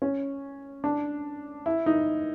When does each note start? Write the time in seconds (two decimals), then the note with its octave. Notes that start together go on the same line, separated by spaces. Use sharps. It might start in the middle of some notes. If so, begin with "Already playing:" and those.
0.02 C#4
0.84 D4
1.66 E4
1.86 D#4